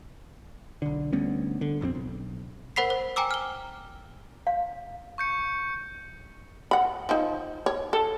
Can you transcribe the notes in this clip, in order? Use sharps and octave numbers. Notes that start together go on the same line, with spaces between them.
B1 D3
D2 G3 B3 C#4
D3
A#1 F2 D#3 C4
B1
A#4 C5 F#5 B5 B6 C7
C5
G5 G#5 A#5 D6 E6
F6 G7
F5
C#6 G6 C#7
F#5 B5
F3 D#4
C#5
A4